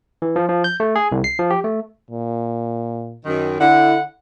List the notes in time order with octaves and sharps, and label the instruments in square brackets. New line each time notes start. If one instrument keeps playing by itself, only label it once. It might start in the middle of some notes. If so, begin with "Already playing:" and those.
[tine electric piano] E3
F3
F3
G6
A3
G#4
C2
C7
F3
G4
A3
[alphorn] A#2
[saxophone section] F#2 D#3
[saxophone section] D3 F#5 [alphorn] E4